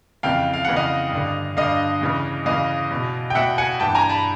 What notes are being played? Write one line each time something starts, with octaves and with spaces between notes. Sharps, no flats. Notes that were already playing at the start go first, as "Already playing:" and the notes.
F2 C#3 E3 F5 G5
F5
F2 C#3 E3 F#5
D#5 F5
G2 D3
G2 D3 D#5 F5
E2 C#3 E3
E2 C#3 E3 D#5 F5
E2 B2
G5
E2 B2 E5 F#5
F#5 G#5
G2 E3 G5 A5
G#5 A#5
A5 B5